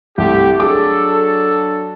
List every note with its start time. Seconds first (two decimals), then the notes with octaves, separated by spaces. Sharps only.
0.18 C2 A3 G4
0.60 F#3 D4 G#4 A4 D6